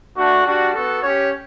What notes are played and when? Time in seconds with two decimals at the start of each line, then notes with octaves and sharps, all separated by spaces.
0.15 A3 D4 F#4
0.44 G3 D4 F#4
0.73 B3 F#4 A4
1.02 C#4 G4 C#5